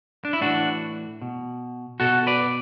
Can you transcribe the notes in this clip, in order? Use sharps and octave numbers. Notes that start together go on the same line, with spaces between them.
D4
E4
A2 E3 D4 F#4
B2
B2 F#4 A4
B4 D5